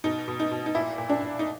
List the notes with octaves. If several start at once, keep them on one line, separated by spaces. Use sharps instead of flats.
B2 D#4
B2
D#4
B2
D#4
A#2 E4
A#2
D4
A#2
D#4